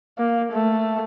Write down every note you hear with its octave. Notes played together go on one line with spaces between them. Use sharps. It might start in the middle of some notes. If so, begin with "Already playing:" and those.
A#3
A3